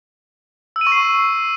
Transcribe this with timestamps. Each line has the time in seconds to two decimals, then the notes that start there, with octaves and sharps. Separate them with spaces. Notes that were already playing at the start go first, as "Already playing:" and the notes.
0.76 E6
0.81 D#7
0.87 C#6
0.92 C7